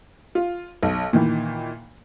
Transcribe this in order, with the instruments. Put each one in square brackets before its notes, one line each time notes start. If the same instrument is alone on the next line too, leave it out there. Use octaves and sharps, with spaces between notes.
[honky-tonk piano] F4
B1
A#2 D#3 E3